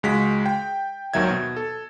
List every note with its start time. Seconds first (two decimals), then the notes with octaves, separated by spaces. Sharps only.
0.03 C#2 G#3 F#4 B6
0.46 G5
1.14 G#1 D#2 D#3 F#3 E5 G#6
1.30 B2
1.56 A4